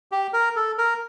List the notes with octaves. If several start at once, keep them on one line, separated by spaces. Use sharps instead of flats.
G4
A#4
A4
A#4